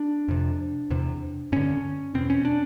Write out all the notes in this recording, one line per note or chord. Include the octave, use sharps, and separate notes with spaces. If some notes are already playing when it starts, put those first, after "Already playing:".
Already playing: D4
F2 C3
E2 C3
G2 D3 C#4
E2 B2 C4
C#4
D4